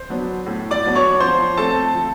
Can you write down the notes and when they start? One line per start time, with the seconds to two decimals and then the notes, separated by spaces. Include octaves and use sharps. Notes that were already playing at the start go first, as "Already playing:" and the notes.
Already playing: C5 C6
0.10 F#3 B3 D4
0.47 A2
0.71 D5 D6
0.83 F#3 B3 D4
0.96 C#5 C#6
1.20 F3 C5 C6
1.57 A3 C4 A4 A5
1.94 F3